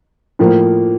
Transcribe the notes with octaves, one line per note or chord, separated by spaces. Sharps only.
A2 F3 A#3